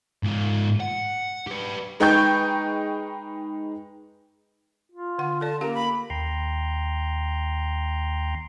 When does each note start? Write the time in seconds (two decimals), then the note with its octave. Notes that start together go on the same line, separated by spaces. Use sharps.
0.23 G#2 F4
0.80 F#5
1.47 G4 B4
2.00 G#3 D#4 B4 G5 C#6 G6
4.92 F4
5.18 D3 F#5
5.41 A4 D5 A5
5.61 A#3 C#4 G4 A#4 F5
5.74 B5
6.10 D#2 G5 A#5 C6